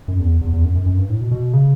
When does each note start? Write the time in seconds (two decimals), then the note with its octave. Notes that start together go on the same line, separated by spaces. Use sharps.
0.08 F#2
0.20 E2
0.41 E2
0.53 E2
0.65 F#2
0.75 F#2
0.86 F#2
0.98 G2
1.09 A2
1.21 B2
1.31 B2
1.53 C#3